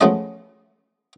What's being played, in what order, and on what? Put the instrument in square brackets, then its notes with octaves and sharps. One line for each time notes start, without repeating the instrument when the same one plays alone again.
[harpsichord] F3 G#3 A3 B3 C#4 D#5